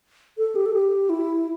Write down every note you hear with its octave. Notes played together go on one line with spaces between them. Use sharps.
A4
G4
A4
G4
E4